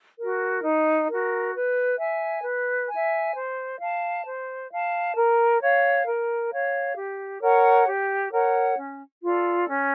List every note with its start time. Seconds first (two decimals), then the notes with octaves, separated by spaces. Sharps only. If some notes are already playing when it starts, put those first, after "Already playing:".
0.18 F#4 A#4
0.63 D#4
1.08 F#4 A#4
1.54 B4
1.99 E5 G#5
2.44 B4
2.89 E5 G#5
3.34 C5
3.80 F5 A5
4.25 C5
4.71 F5 A5
5.15 A#4
5.61 C#5 F5
6.06 A#4
6.51 C#5 F5
6.97 G4
7.42 A#4 C#5 F#5
7.87 G4
8.31 A#4 C#5 F#5
8.77 C#4
9.22 F4 A4 D5
9.68 C#4